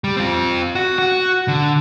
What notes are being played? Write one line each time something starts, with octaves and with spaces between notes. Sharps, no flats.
G3
C4 F4
F#4
F#4
D3